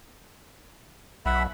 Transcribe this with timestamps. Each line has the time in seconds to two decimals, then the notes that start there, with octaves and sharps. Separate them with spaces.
1.26 B1 E5 F#5 B5